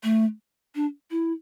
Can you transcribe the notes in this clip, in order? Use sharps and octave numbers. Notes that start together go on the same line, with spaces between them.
A3
D4
E4